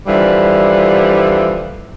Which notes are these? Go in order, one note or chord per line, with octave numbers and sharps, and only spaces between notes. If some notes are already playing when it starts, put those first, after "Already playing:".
D3 E3 F3 G3